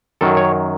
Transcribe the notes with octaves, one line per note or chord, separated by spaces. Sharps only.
F#2 D#3 F#3 A4
C#5